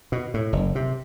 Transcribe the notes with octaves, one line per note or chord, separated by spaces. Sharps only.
B2
A2
F#1
C3